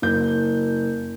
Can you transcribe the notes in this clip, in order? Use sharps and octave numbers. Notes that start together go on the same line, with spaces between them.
F#1 G6